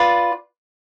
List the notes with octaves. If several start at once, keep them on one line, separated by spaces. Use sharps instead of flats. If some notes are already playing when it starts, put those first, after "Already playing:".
Already playing: F4 B4 D5